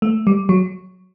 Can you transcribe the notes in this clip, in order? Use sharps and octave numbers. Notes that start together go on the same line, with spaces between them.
A3
G3
F#3